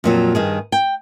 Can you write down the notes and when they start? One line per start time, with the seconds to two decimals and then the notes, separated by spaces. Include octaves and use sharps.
0.04 F2 A#2 F#3
0.35 G2 D#3 G#4
0.72 G5